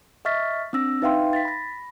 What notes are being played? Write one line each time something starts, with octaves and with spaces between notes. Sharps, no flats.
D#5 E5 C#6 F6 A6 B6
C4 D4 E6 A#6
D#4 B4 E5 F5 G5 C6
A6 B6
B5 A#6